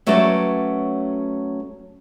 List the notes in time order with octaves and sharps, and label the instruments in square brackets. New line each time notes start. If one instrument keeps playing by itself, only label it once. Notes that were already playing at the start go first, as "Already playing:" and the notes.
[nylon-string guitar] F#3 A3 C#4 F#4 B4 D5